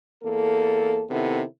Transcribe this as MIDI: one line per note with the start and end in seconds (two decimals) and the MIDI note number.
0.23 1.04 40
0.23 1.04 58
0.23 1.04 69
1.10 1.43 48
1.10 1.43 51
1.10 1.43 59
1.10 1.43 64
1.10 1.43 69